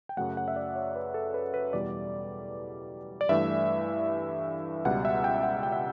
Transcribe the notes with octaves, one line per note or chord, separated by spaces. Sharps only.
G5
F#2 C#3 F#3 A3 F#5
F#5
E5
D5
C#5
B4
A4
B4
B4
E2 B2 G3 D5
D5
G2 E3 A3 E5
C#2 B2 G3 F#5
E5
G5
F#5
G5
E5